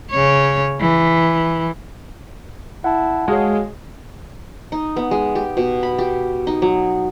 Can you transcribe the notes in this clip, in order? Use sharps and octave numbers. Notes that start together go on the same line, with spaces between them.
C#3 C#5
E3
E4 F#5 A5
G#3 F#4 G#4 C#5 F5
D#4
B3
G#3
G4
B2
B5
G4
D#4
F#3